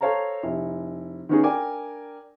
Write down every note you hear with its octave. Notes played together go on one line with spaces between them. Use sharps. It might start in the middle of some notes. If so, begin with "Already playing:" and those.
A4 C5 C#5 F5 A5 A#5
F1 E4
D#3 B3 C#4 D#4 G#4
D4 A#4 D5 G5 G#5 D6